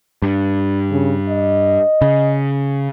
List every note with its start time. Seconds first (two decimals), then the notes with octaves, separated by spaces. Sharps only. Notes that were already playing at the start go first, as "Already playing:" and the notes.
0.22 G2
0.91 C#3
1.29 D#5
2.02 C#3